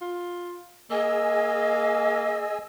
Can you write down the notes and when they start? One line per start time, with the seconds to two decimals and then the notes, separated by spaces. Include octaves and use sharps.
0.01 F4
0.90 A#3 G#4 D#5 G#5 E6